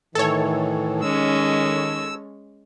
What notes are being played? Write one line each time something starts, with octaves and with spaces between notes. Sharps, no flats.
A2 D#3 E3 A4 C#5
G#3 C#4 E6